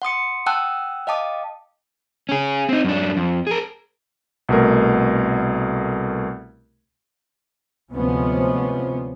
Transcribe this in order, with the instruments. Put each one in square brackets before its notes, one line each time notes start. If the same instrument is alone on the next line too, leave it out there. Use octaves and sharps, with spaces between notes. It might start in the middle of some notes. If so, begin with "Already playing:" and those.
[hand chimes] F#5 C6 D#6 C#7
F#5 G5 A5 D#6 E6 F#6
D#5 F5 G5 A5 D6 D#6
[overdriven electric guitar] C#4 G#4
C4 D#4
F#2 D4
F2
G#4 A#4
[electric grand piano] C2 B2 A3 A#4
[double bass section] D2 C3 F3 G#3 B3 C#4